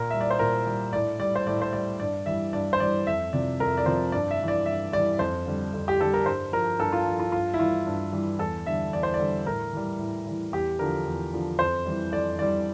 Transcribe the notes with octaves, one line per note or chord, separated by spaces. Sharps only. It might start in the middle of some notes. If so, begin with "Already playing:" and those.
Already playing: A#2 A#4
G3 E5
D5
C5
A#2 A#4
G3
A2 D5
G3 D5
C5
A2 D5
C5
G3 D5
G2 D5
E3 G3 E5
G2 D5
C5
E3 G3 D5
F2 E5
C3 F3 D5
F2 A#4
D5
C3 F3 C5
G2 D5
E5
E3 G3
D5
G2 E5
E3 G3 D5
F2 C5
D3 G3
F2
G4
D3 G3 A4
A#4
G2 C5
F3 A#4
G2 A4
F4
F3
F4
G2 F4
E4
E3 G3 F4
G2
E3 G3
E2 A4
D3 G3 E5
E2 D5
C5
D5
D3 G3
A2 A#4
E3 G3
A2
E3 G3
E2 G4
D3 F3 A#4
E2
D3 F3
F2 C5
E3 G3
F2 D5
E3 G3 D5